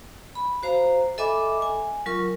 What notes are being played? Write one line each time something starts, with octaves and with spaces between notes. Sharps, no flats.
B5
F#4 C5 F5 A#5
A4 D#5 E5 G#5 B5 D6
G#5
F#3 F4 A#4 C#6